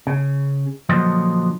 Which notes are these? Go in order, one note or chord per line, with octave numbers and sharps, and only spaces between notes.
C#3
A#2 D3 F3 F#3 C5 D#5